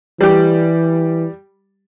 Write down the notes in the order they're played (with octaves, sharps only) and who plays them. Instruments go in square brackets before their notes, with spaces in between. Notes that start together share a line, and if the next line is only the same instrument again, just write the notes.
[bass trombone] E3 [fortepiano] G3 G4